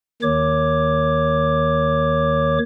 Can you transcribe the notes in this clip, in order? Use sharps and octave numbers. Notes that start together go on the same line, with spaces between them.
D#2 D#3 C#5 D6